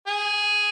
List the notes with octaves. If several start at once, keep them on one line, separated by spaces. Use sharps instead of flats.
G#4